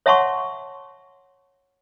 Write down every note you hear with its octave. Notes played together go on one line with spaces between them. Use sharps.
C#5 E5 F#5 A5 C6 C#6